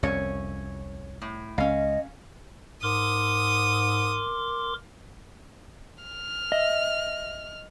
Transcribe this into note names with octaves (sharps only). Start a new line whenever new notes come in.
C2 F2 C#4 C#5
A2
C#2 C#4 D#5 F5
G#2 A#4 C6 D6 D#6
F6
D#5 E5